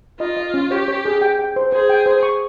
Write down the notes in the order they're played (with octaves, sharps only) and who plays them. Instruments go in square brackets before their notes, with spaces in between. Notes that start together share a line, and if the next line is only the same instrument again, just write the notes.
[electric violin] F4 [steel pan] D#5
[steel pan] D#5
C#4
[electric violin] G4 [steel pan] C#5
[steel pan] C#5
G#4
G5
G5
C5
[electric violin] G#4 [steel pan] C5
[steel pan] G5
C5
C#6